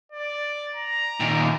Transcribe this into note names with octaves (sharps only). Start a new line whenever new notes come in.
D5
A#5
A#2 D#3